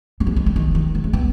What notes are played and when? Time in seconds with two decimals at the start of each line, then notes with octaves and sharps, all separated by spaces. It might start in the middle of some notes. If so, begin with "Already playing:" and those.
0.20 G3
0.27 F3
0.36 D#3
0.46 D3
0.56 D#3
0.75 D#3
0.95 F3
1.04 G#3
1.13 B3